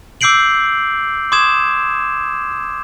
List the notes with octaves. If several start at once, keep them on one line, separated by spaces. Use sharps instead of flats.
D6 E6 G6 C7 D7 F#7
C6 D6 D#6 G#6 E7